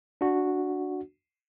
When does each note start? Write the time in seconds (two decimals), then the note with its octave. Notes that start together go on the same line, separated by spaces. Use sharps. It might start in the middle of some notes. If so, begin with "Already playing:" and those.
0.21 D4 F#4